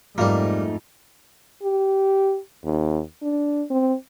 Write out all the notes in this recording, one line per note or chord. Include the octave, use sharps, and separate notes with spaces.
F2 G#2 F3 G3 A3 A#3 D#4
G4
D#2
D4
C4